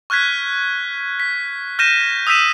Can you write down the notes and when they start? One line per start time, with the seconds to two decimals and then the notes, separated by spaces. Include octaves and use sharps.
0.10 C#6 F6 F#6 G#6 B6
1.20 B6
1.79 F6 G6 A#6 D#7 E7
2.27 D#6 E6 G6 B6 D#7 E7